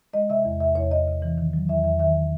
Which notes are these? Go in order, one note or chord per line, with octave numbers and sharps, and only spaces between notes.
G#3 D#5
C3 E5
E2
C3 E5
E2 C#5
E2 D#5
C3
E3
D#3
F#3
E2 E5
E2 E5
D#3 E5